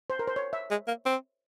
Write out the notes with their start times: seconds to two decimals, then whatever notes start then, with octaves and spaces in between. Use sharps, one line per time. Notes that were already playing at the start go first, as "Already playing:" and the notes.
0.10 C5
0.19 A#4
0.27 C5
0.36 C#5
0.53 E5
0.71 G#3
0.88 A#3
1.06 C4